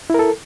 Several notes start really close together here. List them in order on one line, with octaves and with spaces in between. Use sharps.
E4 A#4 A4